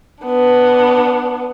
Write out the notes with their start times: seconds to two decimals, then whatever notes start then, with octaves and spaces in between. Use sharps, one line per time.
0.24 B3 D4